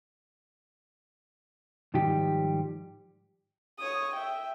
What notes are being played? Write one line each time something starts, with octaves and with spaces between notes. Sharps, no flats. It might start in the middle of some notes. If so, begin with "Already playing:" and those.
G#2 D#3 F3 G3 G4
C#5 D#6
E5 G5